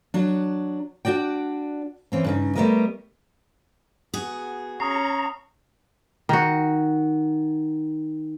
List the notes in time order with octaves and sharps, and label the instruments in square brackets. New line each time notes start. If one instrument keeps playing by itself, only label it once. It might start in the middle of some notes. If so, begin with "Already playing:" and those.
[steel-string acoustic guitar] F#3 D4
D4 F#4 D5 G5
E3 C4 C#4
G2 C#3 D#4
G3 A3 B3 E4 A#4 D#5
[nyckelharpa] B3 [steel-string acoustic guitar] F#4 G#4
[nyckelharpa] C#4 C#6 [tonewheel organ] A#5 [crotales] D#6 C7
[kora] D#3 F#4